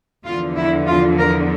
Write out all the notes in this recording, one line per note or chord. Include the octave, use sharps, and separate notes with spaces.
E2 D3 F3 F4
E4
F4
A#4